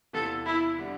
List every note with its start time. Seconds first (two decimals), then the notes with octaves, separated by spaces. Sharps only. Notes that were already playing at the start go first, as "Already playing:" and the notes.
0.13 E2 C3 E3 B3 F4 A4
0.46 E4
0.78 D3 G3 D4